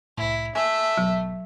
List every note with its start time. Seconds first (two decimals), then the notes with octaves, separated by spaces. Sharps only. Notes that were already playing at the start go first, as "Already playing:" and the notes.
0.18 C2 A2 E4
0.55 A3 E5 G#5
0.97 G#1 B2 F#3